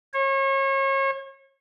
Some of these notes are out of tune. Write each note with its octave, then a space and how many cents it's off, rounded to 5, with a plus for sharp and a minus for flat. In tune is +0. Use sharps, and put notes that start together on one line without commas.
C#5 -35